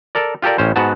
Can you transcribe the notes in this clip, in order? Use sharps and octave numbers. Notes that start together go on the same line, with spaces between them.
A4 A#4 D5
F4 G4 A4 A#4 D5
A1 C#4 C5
G#2 B3 F#4 A5